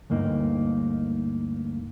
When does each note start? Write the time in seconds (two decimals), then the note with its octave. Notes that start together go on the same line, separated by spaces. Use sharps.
0.10 D2 G2 A#3 D#4